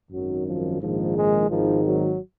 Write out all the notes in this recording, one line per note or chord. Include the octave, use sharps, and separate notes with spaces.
G#1 F#2 D#3 F#3
F3
A#1 G#2 D#3 F3
G#3
G#1 G#2 D#3 F3
F#3